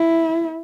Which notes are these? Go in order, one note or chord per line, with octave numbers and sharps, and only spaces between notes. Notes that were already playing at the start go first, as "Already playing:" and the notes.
Already playing: E4